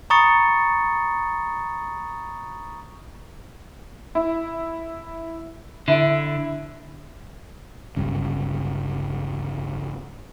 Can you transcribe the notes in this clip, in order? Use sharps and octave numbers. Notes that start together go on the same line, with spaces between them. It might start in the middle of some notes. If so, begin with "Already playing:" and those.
A#5 B5 C#6 D#6 A6 C#7
E4
D3 E4 E5 D7
G1 C#2 G2 C#3